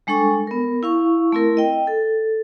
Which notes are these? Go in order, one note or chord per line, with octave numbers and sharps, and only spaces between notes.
G3 G#3 D4 A4 C#6
B3 A#4
E4 F5 C#6
A3 C4 E4 A#4
D#5 G5
A4